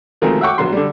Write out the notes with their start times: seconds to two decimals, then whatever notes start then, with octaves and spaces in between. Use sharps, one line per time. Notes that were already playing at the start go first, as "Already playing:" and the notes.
0.22 B2 D#3 F3 G#3 A3 C4
0.41 E5 F#5 G5 C#6 D6
0.58 A#1 B2 F#3 C6
0.72 D3 G3